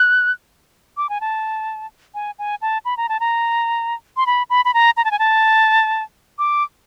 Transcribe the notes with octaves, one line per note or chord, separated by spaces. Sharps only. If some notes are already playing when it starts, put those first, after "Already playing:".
Already playing: F#6
D6
G#5
A5
G#5
G#5
A5
B5
A#5
A5
A#5
C6
B5
B5
B5
A#5
A#5
A5
G#5
A5
D6